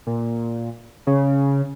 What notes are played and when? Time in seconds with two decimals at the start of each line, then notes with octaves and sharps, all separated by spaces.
0.07 A#2
1.07 C#3